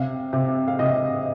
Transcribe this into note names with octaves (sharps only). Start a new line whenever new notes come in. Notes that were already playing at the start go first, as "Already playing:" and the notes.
Already playing: C3 F5
C3
F5
C3 D#5